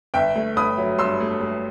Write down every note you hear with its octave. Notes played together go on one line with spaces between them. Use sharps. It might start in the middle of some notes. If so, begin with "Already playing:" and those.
G1 E5 G5
A3
G1 B5 D#6
F#3
G2 C6 E6
A3
A3